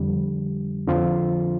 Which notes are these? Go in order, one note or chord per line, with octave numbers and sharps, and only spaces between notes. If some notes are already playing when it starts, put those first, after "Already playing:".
Already playing: F2 D3 G3
F2 D3 F3 C4 F4